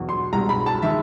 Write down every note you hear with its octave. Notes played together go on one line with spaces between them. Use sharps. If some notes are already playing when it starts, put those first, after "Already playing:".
Already playing: E2 B2 F#3
C6
C2 B2 G#3 A#5
B5
A5
D#3 G#3 E5